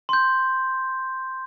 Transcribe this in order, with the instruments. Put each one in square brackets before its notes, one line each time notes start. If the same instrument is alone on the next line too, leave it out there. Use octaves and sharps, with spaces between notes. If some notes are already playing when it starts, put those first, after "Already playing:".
[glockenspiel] C6 G6